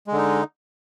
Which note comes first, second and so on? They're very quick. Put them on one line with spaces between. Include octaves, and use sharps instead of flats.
G#3 D3 D#4